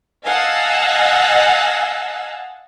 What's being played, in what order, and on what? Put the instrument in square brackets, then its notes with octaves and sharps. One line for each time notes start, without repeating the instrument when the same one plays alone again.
[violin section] D#5 F5 F#5 G#5 A5 E6